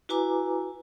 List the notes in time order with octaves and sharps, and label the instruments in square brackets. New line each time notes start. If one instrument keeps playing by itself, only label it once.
[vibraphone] E4 F#4 B4 G#5 A#5 D6